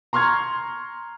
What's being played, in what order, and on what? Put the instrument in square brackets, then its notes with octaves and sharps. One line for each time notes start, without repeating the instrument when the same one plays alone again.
[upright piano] A#5 C6 C#6 F6 G#6